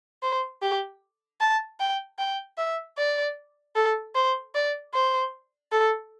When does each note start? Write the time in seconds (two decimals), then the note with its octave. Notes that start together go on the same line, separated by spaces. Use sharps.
0.23 C5
0.62 G4
1.41 A5
1.80 G5
2.19 G5
2.58 E5
2.98 D5
3.76 A4
4.15 C5
4.55 D5
4.94 C5
5.72 A4